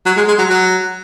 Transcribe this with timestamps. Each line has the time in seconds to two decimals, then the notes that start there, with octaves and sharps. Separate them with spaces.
0.06 F#3
0.17 G#3
0.28 G#3
0.39 F#3
0.50 F#3